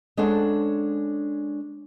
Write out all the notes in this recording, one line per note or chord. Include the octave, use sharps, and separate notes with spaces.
G#3 C#4 D4 A4 C5 F#5